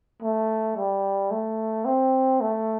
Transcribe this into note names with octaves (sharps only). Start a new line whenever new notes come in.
A3
G3
A3
C4
A3